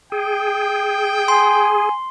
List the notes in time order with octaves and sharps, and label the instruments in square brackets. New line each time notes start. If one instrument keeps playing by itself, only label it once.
[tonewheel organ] G#4 [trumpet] G5
[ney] G#5 [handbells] C6